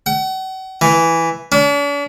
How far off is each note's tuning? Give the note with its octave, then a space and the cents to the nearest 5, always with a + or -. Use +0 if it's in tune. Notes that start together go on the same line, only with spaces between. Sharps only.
F#5 +40
E3 +0
D4 -45